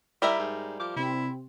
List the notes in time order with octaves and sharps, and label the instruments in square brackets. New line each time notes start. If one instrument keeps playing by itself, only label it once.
[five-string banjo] G3 A#4 E5 [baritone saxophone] E4
[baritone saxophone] G#2
[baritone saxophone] F3 [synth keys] D6
[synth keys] C3 C4 [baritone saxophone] E4